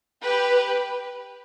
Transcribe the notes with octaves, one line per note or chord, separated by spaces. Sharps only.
G4 B4